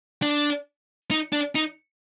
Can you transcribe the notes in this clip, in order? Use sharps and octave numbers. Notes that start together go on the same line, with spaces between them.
D4
D#4
D4
D#4